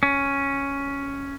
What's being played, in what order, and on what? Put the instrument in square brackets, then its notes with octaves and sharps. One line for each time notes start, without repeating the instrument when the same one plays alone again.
[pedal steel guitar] C#4